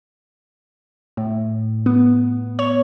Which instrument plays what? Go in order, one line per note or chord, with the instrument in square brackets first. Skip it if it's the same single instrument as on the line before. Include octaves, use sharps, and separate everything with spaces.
[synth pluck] A2
B3
C#5